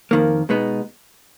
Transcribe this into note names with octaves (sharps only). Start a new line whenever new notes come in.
F2 D#3 A#3
B2 G#3 B3 D#4